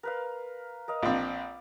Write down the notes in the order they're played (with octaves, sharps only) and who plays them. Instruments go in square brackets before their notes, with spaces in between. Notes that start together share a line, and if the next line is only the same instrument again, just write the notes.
[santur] A#4 B4 F5
A#4 D#5 F5
[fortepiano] A#1 C4 [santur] D5 A5 B5